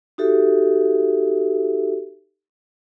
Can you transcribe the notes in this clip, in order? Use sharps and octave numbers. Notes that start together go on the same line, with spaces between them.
D#4 F#4 G4 A4 E5